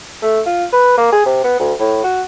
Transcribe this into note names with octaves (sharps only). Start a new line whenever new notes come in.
A3
F4
B4
A#3
G#4
C3
B3
D2
A2
F#4